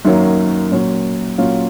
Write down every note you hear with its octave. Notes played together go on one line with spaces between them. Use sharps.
F#2 D#3 F#3 A#3 C#4
A#2 F#3 C#4
A#2 F#3 C#4 F4